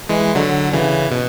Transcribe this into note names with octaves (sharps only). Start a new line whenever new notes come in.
E3 G#3
D3 F#3
C#3 E3
B2